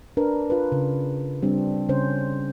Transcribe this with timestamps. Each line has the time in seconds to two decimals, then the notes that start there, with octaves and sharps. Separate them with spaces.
0.17 D4 A#4 B4
0.50 F4 B4
0.72 C#3
1.43 G3 C4 D4
1.89 C#3 C#4 C5